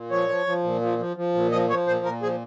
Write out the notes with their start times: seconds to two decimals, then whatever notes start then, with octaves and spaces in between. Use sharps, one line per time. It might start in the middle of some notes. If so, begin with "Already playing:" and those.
Already playing: A#2
0.11 F3 C#5
0.29 F3
0.46 F3
0.64 A#2
0.81 F3
0.98 F3
1.17 F3
1.35 A#2
1.51 F3 D#5
1.69 F3 C#5
1.87 A#2 C5
2.05 A#2 A#4
2.22 F3 G#4